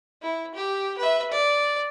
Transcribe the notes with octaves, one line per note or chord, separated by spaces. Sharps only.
E4
G4
B4 E5
D5